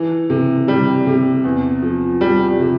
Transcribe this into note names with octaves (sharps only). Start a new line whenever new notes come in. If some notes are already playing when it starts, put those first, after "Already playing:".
Already playing: E3
C3
C3 G3
C3
E2
F3
F3 G3
C3